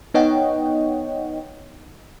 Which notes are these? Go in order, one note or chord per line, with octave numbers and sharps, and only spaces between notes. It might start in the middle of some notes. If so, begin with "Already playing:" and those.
B3 D#4 C#5 D#5 F#5 G5